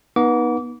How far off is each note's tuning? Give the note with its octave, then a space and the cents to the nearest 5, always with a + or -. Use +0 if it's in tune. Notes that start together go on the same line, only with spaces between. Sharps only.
B3 -30 D#4 +0 D6 -30